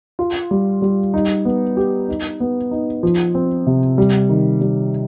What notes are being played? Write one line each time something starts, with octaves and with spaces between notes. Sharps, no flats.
F4
G3
G3
D#4
B3
G4
D#4
B3
D#4
F3
C4
C3
G3
D#3
G3